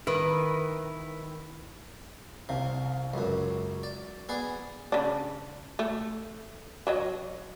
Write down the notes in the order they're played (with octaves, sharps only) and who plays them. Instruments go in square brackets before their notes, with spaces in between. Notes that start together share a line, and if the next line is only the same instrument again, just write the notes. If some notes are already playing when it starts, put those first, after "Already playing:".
[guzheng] D#3 [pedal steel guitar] E4 B5 D#6 [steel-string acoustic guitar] B4
[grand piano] C2 F5 [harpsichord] C3
[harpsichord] C#2 F#2 [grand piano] F#3
[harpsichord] D5
B3 G#4 D5
[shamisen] C#3 D4
A3
F#3 C#5 D#5